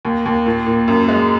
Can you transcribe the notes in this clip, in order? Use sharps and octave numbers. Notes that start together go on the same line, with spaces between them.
D#2
D#2
A#2
A#2
F#2
G#3